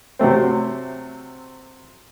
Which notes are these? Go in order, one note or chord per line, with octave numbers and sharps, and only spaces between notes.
C3 F#3 A3 C4